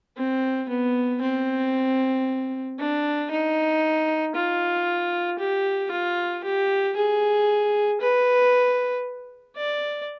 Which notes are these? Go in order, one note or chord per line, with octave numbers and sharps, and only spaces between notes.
C4
B3
C4
D4
D#4
F4
G4
F4
G4
G#4
B4
D5